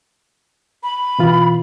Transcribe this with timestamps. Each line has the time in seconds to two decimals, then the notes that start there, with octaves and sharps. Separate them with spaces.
0.83 B5
1.19 B2 E3 F4